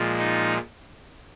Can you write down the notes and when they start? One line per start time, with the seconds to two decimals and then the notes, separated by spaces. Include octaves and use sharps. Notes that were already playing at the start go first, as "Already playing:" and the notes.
Already playing: A#2 F3 G#3
0.18 D#4